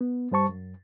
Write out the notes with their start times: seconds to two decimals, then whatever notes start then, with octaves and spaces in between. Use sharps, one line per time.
0.01 B3
0.31 G2 G3 C5 A5 C#6
0.49 F#2